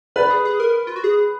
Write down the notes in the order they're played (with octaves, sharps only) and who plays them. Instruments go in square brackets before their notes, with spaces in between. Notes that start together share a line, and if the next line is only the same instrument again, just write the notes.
[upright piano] B4 [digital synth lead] D5
[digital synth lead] G#4
G#4
A#4
F4
F#4
G#4